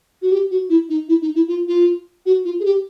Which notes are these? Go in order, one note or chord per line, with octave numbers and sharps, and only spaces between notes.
F#4
G4
F#4
E4
D#4
E4
D#4
E4
F4
F4
F#4
F4
G#4
G4